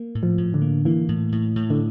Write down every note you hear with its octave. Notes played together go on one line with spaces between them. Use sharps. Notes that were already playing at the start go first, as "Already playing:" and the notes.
Already playing: A#3
A2
F3
A2
D3
A#3
E3 A#3
A2
A2
A2
D3